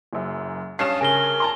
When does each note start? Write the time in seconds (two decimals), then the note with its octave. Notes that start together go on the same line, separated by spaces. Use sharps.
0.13 F#1 F#2
0.79 G2 C#4 F5 A5 D#6 C7 E7
1.01 C#3 A#4 G#5 A#6 G7
1.40 A5 A#5 C6